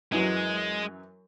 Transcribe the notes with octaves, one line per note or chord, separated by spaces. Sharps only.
F#2 E3 F#3 G#3